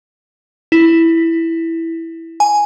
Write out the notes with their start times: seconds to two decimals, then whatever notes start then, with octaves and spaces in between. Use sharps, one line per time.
0.72 E4
2.40 G#5